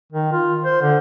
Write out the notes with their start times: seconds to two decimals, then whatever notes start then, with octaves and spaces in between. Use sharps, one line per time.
0.13 D#3
0.32 F4
0.65 C5
0.81 D3